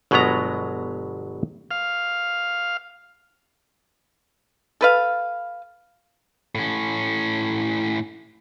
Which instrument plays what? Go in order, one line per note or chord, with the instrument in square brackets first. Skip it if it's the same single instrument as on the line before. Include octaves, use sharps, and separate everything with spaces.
[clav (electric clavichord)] G1 B2 F#3 G#3 B3 A#5
[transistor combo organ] F5
[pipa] A4 B4 F5
[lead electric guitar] A2 C#4